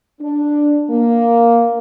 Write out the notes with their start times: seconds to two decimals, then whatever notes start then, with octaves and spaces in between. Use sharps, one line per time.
0.21 D4
0.90 A#3